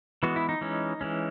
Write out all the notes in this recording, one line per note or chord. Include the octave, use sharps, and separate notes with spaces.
E3 G#3 B3 F#4
E4
D#4
E3 G#3 C#4
E3 G#3 C#4